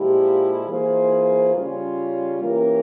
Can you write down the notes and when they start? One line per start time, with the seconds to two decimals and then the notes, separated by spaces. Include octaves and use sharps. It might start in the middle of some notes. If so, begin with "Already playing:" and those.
Already playing: A#2 F3 G#3 E4 G4
0.67 E3 A#3 F4 G#4 C5
1.54 C#3 G3 C#4 F4
2.41 E3 A#3 C#4 G4 A#4